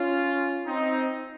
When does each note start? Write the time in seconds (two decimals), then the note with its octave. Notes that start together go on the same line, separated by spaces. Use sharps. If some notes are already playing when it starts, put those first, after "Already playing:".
Already playing: C#4 F4
0.67 C4 D#4